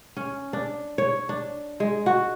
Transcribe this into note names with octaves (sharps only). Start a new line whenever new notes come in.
C#4
D4
C#5
D4
G#3
F#4